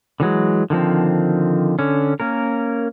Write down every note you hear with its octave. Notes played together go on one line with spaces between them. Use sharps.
D3 E3 F#3 G#3
D3 D#3 F3 C4
D3 C#4
A#3 C#4 A#4